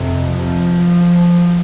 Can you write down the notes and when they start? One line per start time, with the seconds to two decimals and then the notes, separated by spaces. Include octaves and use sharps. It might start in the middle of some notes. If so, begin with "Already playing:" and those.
Already playing: F2 C3
0.23 F3